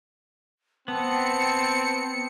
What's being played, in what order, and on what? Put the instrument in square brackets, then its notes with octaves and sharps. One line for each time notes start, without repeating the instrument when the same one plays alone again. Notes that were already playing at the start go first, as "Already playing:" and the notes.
[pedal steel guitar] B3 [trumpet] C4 [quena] A5 [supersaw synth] C#7